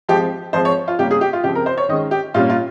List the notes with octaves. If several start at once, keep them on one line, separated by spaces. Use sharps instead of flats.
F3 G#3 C4 G4
F3 G#3 C4 C5
C#5
F4
C#3 G3 A#3 C#4 G4
G#4
G4
F4
C#3 F3 C4 G4
A#4
C5
C#5
D#3 G#3 C#4 D#5
G4
A#2 G3 A#3 C#4 F4
F4